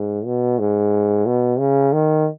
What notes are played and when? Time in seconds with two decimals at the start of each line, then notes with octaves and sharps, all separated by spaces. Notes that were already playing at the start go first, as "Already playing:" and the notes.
Already playing: G#2
0.26 B2
0.59 G#2
1.26 B2
1.59 C#3
1.93 D#3